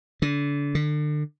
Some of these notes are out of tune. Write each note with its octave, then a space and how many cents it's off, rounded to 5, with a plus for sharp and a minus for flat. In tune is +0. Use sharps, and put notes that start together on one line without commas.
D3 -30
D3 +35